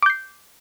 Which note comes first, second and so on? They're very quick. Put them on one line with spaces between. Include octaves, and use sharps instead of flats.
D6 G6 C7